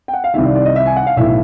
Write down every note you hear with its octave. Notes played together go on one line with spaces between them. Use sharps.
G5
F#5
F5
C2 C3 D#3 E5
D5
D5
D#5
E5
G#5
F#5
F5
B1 A2 E3 E5